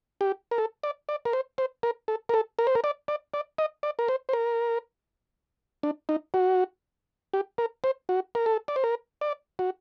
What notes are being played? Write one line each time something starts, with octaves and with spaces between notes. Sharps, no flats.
G4
A#4
A4
D5
D5
A#4
C5
C5
A#4
A4
A#4
A4
A#4
C5
A#4
D5
D5
D5
D#5
D5
A#4
C5
C5
A#4
D4
D#4
F#4
G4
A#4
C5
F#4
A#4
A4
D5
C5
A#4
D5
F#4